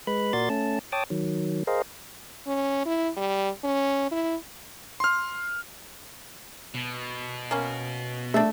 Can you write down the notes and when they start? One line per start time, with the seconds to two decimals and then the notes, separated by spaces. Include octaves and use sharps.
0.07 G#3 B4 B5
0.33 A#2 F#4 A#4 D5 C6 A6
0.50 A3 C#4 A5
0.92 C#5 G5 A5 D6 D#6
1.10 D#3 F#3
1.67 G#4 A#4 C5 D#5 F5
2.47 C#4
2.85 E4
3.17 G3
3.64 C#4
4.11 E4
5.00 C6 F6
6.75 B2
7.51 A#3 C#4
8.34 A3 D4 E5